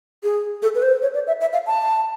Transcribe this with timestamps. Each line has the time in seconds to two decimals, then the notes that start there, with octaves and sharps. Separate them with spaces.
0.23 G#4
0.62 A4
0.75 B4
0.82 C5
1.02 C#5
1.14 D5
1.27 E5
1.41 E5
1.53 F5
1.67 A5